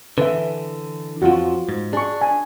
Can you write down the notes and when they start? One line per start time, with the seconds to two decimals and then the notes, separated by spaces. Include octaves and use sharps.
0.18 D3 E3 B4 E5
1.22 F2 F3 F4 F#4
1.69 G#2
1.93 D4 G#4 C#6
2.21 G#5